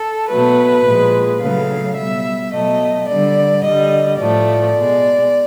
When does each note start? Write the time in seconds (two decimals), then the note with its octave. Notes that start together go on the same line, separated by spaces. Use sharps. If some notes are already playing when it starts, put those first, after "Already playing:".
Already playing: A4
0.29 B2 F#3 A3 B4
0.85 A#2 F3 G#3
1.41 C#3 F#3 A3 F5
1.97 B2 G3 E5
2.53 B2 F#3 A3 D#5
3.08 D3 G3 D5
3.64 D3 G3 D#5
4.20 A2 F3 A3 D5
4.76 B2 G#3